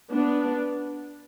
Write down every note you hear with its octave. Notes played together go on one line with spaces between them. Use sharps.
B3 D4